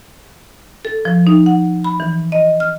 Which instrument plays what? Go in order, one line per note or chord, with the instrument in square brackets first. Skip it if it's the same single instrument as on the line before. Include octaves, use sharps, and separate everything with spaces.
[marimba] A4
F3
D#4
F#5
B5
E3
D#5
F6